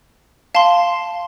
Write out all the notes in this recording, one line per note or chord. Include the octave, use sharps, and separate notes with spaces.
F5 A5 C6